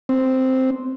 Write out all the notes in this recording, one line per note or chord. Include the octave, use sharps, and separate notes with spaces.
C4